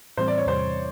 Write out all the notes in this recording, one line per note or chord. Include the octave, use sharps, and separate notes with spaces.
A2 E3 G3 C4 C5
D5
C#5
E2 C3 E3 G3 C5